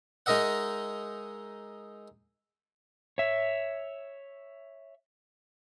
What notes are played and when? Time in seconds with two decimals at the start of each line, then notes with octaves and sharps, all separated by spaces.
0.26 G#3 D#4 A#4 D#5 E5 F#5
3.18 C#5 E5